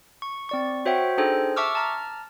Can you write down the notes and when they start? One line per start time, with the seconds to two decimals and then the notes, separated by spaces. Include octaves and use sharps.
0.22 C#6
0.49 C4 D5 C#6
0.86 F#4 C5 C#5 E5 F#5 G5
1.18 D4 D#4 G#4 A4 C5 G5
1.56 E5 A5 C#6 D6 E6 F6
1.75 A5 A#5 F6